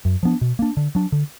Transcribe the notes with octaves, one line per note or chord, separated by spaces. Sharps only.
F#2
F3 B3 D4
B2
A#3 D4
D3
F#3 D4
D3